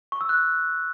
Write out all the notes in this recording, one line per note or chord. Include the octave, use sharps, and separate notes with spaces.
C#6
E6
F#6